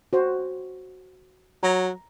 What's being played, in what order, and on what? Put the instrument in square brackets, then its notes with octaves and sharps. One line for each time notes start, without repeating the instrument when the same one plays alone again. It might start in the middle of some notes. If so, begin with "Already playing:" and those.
[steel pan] F#4 C5
[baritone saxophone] F#3 [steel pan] A#5